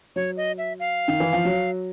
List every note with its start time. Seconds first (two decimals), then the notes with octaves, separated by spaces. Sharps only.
0.16 F#3 C#5
0.37 D#5
0.58 E5
0.80 F5
1.08 D#3
1.20 E3
1.33 F3
1.45 F#3